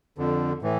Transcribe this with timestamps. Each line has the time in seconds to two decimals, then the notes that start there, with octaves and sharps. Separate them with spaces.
0.18 F2 D3
0.62 A2 E3